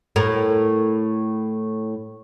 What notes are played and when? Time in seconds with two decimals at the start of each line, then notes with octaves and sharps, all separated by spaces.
0.16 A2 A#4